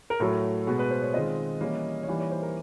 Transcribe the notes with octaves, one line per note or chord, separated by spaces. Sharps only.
A#4
A2 F#3 A3 A4
B2 G#3 B3
B4
C5
C#5
D#3 G#3 C4 F4 D#5
E3 G3 A#3 C#4
C#5
E3 G3 A#3 D#4 D5
C#5
C5
A#4